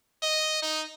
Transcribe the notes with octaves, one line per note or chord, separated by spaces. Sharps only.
D#5
D#4